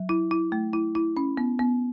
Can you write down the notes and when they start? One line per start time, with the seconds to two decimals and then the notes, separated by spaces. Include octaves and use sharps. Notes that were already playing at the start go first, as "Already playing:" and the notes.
Already playing: F#3
0.09 E4
0.31 E4
0.52 A3
0.73 E4
0.95 E4
1.17 C#4
1.37 B3
1.59 B3